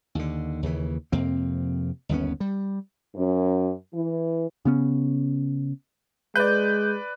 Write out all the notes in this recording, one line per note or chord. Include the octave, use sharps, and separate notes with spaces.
D#2 D3
D#2 C#3 E3
F2 C3 A#3 C4
G1 D#2 B3 C#4
G3
F#2
E3
C#3 B3 C#4
G#3 B4 D5 G6